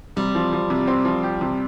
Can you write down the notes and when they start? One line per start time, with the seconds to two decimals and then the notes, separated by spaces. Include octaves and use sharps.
0.16 C3 G3
0.35 F3
0.52 F3
0.70 C3
0.88 C4
1.05 F3
1.23 G4
1.41 C3